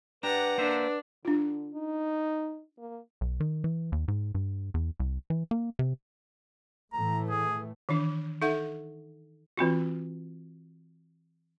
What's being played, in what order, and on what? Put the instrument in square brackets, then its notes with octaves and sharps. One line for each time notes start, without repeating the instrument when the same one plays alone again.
[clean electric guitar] D4 G4 [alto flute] B4 [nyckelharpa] F#5 A#5
[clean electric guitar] A#3 C5 E5 [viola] D4
[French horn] D3 [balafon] D4 F4
[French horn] D#4
A#3
[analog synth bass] B1
D#3
E3
D#2
G#2
G2
E2
C2
E3
A#3
C3
[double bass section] A2 E3 A3 [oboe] A#5
[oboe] G#4
[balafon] D#3 E3 D4
D#4 A4 E5 F#5
E3 C4 F4 F#4